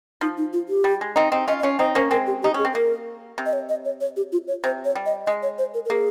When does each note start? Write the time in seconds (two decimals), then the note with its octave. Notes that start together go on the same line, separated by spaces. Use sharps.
0.21 F3 D#4
0.37 D#4
0.53 F4
0.69 G4
0.84 G3
1.01 G#3
1.16 C4 D#4
1.32 C4 D#4
1.48 C#4 F4 D#5
1.59 D#5
1.63 C#4 F4 C#5
1.79 C4 D#4 C5
1.95 A#3 C#4 C5
2.11 G#3 C4 A#4
2.27 G4
2.43 D#4 G4
2.54 C#4 G#4
2.65 C4
2.74 A#3 A#4
3.38 C3
3.46 D#5
3.53 C#5
3.69 D#5
3.85 C#5
4.01 C#5
4.16 G4
4.33 F4
4.48 C#5
4.64 C3 C5
4.85 C#5
4.95 G3
5.06 D#5
5.26 G#3 D#5
5.43 C#5
5.58 C5
5.74 A#4
5.85 A#4
5.90 A#3 G#4